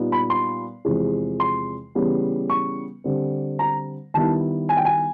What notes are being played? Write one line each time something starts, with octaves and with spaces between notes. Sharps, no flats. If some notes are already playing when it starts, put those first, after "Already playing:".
Already playing: A#2 G3 B3 D#4
B5
C6
E2 C3 F3 G#3
C6
C#3 E3 G3 B3
C#6
D3 G3 C4
A#5
D#3 G3 B3 E4 A5
G#5
G5
G#5